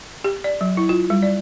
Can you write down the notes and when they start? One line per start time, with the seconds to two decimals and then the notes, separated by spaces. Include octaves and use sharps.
0.24 G4
0.44 D5
0.61 F#3
0.77 E4
0.89 F4
1.10 G3
1.23 D5